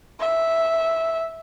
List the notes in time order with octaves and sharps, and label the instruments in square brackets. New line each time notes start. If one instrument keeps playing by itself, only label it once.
[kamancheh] E5